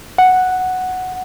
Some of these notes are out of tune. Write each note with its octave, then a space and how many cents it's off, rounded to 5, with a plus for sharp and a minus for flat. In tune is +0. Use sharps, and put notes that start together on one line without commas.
F#5 +0